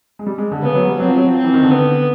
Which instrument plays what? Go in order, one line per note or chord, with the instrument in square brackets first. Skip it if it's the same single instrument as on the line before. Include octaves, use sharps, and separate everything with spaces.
[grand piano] G#3
G3
G#3
D3
[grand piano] C#3 [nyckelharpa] B3
[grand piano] F#3
G3
[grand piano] F#3 [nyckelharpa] C4
[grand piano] F3
F#3
F3
[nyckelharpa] C4
[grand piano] E3
D#3
D3
[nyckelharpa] B3